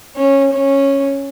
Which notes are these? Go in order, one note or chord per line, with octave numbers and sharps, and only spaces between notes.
C#4
C#4